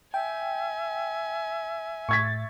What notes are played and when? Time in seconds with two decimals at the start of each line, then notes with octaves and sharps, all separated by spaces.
0.14 E5 G5 G#5
2.09 A2 C#6 G#6 A6 B6